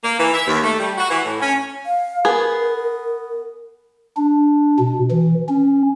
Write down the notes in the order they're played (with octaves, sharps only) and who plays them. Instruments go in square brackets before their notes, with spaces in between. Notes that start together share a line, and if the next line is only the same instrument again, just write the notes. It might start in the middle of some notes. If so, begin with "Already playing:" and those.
[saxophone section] A#3
E3
E5
D#2
A3
G3
F#4
E3
A2
C#4
[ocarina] F5
[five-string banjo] B3 G#4 [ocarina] A#4
[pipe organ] D4
B2
E3
C#4